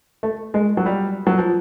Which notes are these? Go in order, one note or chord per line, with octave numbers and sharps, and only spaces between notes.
A3
G#3
F#3
G3
F#3
F3